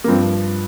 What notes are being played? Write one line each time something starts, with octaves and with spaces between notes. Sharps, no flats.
A#3
G2 F3 C4